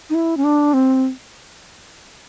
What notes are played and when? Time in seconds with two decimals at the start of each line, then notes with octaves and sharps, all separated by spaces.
0.10 D#4
0.15 E4
0.37 C#4
0.44 D4
0.74 C4